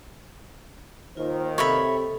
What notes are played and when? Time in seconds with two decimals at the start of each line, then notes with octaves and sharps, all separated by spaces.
1.17 D#2 D#3 F4 C5
1.58 C3 A4 C#5 E5 B5